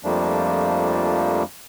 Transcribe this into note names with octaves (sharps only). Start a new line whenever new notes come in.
F2 F3 G3 A3 A#3 D4